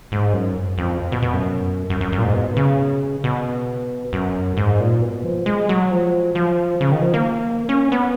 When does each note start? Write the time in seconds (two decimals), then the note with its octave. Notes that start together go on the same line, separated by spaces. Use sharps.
0.12 G#2
0.33 F#2
0.78 F2
1.12 B2
1.22 B2
1.33 F#2
1.90 F#2
2.01 F#2
2.12 F#2
2.18 A#2
2.24 G#2
2.34 B2
2.57 C#3
3.24 B2
4.13 F#2
4.57 G#2
4.80 A#2
5.01 B2
5.24 F3
5.46 G#3
5.69 F#3
5.91 F3
6.35 F3
6.81 C#3
6.92 D#3
7.02 F3
7.14 A#3
7.69 C#4
7.92 B3